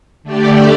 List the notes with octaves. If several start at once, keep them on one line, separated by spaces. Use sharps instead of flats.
D3 A3 G4 D5